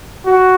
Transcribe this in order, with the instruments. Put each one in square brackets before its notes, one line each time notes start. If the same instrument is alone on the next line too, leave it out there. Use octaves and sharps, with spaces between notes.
[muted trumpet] F#4